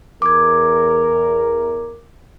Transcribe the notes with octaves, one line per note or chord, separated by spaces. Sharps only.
E2 A#4 D6 G#6